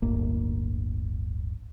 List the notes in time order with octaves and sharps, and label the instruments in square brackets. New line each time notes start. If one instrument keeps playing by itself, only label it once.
[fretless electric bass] D1 G1 A#3